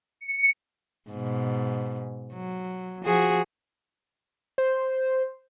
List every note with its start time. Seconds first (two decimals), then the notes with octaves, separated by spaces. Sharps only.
0.21 C#7
1.10 G#2 B2
2.33 F#3
3.04 F3 F#4 G#4
4.58 C5